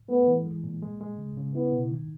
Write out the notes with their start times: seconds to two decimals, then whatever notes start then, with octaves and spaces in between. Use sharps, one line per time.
0.09 A3 B3
0.27 E3
0.46 G#3
0.64 A#2
0.82 G#3
1.01 G#3
1.18 C#3
1.37 C#3
1.54 B3 E4
1.72 B2
1.91 D#3